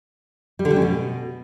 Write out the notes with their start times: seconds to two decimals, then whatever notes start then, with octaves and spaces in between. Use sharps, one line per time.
0.59 G3
0.65 D3
0.71 G3
0.76 C#4
0.82 B2